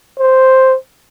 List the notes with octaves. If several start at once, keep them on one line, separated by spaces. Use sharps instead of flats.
C5